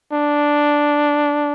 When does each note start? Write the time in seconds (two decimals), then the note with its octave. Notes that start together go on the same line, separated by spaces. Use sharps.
0.12 D4